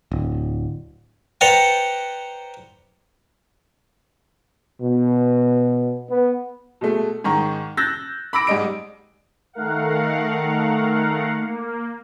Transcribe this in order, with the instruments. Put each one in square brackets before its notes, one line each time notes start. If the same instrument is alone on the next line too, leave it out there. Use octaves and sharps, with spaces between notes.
[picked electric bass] D1
[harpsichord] B4 C5 D5 F#5 G5 A#5
[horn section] B2
B3
[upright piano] B2 G#3 A3
G#2 D#3 A#5 C#6
E6 F#6 G6 A6 A#6
B5 D6 E6 A#6 D7
G#2 G3 D#5 D7
[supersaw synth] D#3 A3 A#4 F5 F#5
A#3